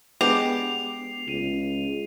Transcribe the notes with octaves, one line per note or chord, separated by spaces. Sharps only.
G#3 B3 D4 G4 C7 F7
C#2 D#7 F7